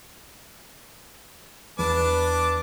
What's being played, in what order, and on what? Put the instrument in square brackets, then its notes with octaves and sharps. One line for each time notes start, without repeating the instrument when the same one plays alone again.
[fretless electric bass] E2 [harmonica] D4 A5 D6 [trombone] B4